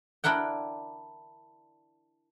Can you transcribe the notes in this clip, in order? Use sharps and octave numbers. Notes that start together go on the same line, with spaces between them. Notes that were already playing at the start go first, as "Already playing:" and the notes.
D4 E4 A#4 F#5 G5